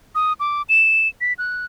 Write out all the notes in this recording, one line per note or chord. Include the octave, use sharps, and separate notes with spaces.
D#6
D6
E7
B6
F#6